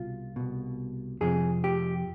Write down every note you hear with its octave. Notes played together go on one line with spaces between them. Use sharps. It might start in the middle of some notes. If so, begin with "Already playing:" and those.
Already playing: C2 B2 F4
C2 B2
F2 C3 F3 G#4
G4